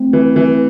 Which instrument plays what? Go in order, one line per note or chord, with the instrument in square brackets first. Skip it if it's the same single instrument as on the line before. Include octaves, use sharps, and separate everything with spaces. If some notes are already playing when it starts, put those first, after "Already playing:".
Already playing: [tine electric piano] A3 C4
[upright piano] E3
E3